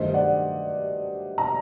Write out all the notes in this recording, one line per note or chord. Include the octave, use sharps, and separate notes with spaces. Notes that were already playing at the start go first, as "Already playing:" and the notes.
Already playing: G2 D#3 F#3 A3 C5 D#5
D5 F#5
A#5